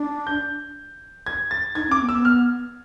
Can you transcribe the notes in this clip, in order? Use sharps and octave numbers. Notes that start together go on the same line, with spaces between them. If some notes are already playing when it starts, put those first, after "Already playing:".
Already playing: D4
G6
G#6
A6
D#4 G#6
C#4
D6
B3
E6
B3
F6